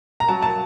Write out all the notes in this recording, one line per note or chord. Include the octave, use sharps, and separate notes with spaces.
A#5
F#3 A5
A5